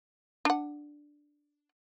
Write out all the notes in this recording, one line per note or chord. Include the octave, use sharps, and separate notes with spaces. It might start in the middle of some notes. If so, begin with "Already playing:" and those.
D4 F#5